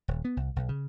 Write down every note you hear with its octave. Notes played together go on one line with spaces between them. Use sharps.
D#1
B3
C2
B1
C#3